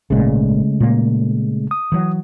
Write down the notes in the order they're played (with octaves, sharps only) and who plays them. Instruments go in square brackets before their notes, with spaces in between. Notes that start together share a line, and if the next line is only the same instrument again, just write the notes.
[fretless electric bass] G#1 A#2 [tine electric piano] C#3 G#3 A3
[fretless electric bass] A#2 A#3
[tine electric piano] D#6
[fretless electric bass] E3 F#3